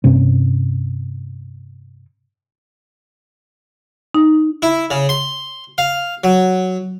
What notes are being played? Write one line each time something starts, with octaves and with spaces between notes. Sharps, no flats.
G2 C3 C#4
D#4
E4
C#3
C6
F5
F#3